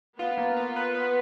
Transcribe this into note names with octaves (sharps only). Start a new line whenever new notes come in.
B3 F4
A#3
F4
B4
B4